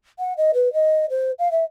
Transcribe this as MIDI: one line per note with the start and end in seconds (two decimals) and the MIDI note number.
0.19 0.34 78
0.37 0.51 75
0.54 0.72 71
0.73 1.06 75
1.10 1.31 72
1.39 1.51 77
1.51 1.64 76